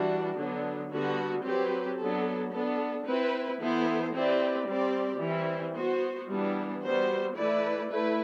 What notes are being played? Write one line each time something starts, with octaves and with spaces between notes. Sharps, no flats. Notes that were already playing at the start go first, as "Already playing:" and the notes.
Already playing: E3 G3 D4 F#4
D3 F#3 B3 D4
D3 G3 B3 F#4
F#3 C4 G4 B4
F#3 B3 D4 A4
B3 D4 A4
C4 E4 B4
E3 B3 E4 A4 C5
C4 E4 G4 B4 D5
G3 C4 G4 D5
E3 G3 C4 E4
B3 F#4 C5
E3 G3 B3 D4
G3 B3 F#4 C5
E3 A3 E4 B4 D5
A3 E4 B4